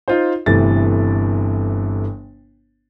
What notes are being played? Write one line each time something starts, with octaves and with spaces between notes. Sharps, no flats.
D#4 F4 C5
G1 C3 E3 A3 A6